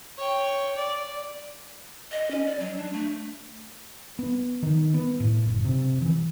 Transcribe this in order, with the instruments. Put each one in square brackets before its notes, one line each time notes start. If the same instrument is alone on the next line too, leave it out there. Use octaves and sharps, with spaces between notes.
[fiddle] C#5 G5
D5
[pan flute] D#5
C#4
D5
F#3
D4
A3
[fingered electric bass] B3
D#3
B3
A2
F#1
C3
E3